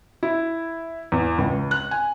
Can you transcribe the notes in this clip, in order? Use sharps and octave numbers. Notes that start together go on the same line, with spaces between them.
E4
E2
C#2
F#6
G#5